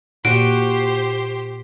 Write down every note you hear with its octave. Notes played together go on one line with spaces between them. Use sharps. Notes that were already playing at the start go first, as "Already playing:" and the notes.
A#2 F#4 G4 C5 D7